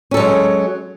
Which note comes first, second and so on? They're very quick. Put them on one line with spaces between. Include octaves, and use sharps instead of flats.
C#4 A4 F#3 G#3